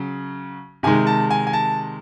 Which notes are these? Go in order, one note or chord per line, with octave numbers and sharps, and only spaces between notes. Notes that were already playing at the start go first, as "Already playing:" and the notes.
Already playing: C#3 F#3
C3 D#3 G#3 G#5
A5
G#5
G#5
A5